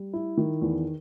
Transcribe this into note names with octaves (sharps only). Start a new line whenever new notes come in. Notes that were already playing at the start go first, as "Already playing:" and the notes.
Already playing: G3
E4
D#3
E2